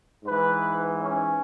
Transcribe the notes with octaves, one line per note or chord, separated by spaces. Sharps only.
G#2 E3 B4
C#4